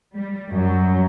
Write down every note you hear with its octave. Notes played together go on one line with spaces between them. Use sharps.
G3
F#2 F#3